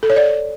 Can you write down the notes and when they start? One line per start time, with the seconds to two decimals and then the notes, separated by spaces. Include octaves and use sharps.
0.03 A4
0.10 C#5
0.16 D5